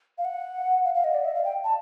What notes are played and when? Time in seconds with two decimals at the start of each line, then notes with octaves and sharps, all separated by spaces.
0.18 F5
0.25 F#5
0.84 F5
0.94 F5
1.04 D#5
1.14 D5
1.25 E5
1.34 F5
1.44 G5
1.64 A5